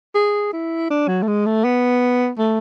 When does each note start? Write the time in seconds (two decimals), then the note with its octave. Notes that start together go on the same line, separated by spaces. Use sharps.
0.15 G#4
0.53 E4
0.90 D4
1.08 F#3
1.22 A3
1.27 G#3
1.46 A3
1.64 B3
2.38 A3